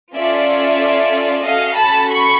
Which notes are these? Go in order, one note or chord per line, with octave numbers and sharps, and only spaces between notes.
C#4 F4 A4 D5 E5
C#4 F#4 A4 D#5 F5
A5 B5
B5 C#6